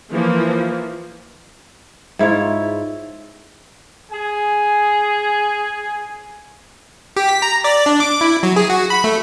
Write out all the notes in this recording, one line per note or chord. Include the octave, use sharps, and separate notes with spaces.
E3 F3 A#3
G#2 E4 F4 C#5
G#4 G#5
G4
B6
A#5
D5
D4
D6
E4
F#3
G#4
F#4
B5
A3